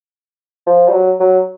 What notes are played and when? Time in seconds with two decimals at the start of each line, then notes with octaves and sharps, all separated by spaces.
0.67 F3
0.88 G3
0.92 F#3
1.20 F#3